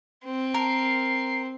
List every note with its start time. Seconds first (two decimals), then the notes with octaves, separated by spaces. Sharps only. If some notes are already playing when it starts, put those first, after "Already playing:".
0.24 C4
0.54 A#4 C7